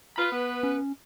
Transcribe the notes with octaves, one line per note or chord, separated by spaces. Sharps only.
F4 B4 B5
B3
C#4